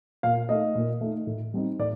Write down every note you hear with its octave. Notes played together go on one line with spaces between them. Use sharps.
A#2 F5
A3 D#4 D#5
A#2
A3 D#4
A2
G3 C4 D#4
A2 D5